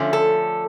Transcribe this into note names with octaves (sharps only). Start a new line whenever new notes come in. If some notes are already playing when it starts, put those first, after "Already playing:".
Already playing: D3 F3 A3 C#4
A4